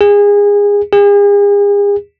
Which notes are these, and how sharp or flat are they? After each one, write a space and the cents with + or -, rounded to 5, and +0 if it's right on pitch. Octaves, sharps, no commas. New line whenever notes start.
G#4 -25
G#4 -40